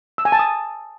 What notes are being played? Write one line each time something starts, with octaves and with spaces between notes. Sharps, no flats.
E6
G#5
A5
D#6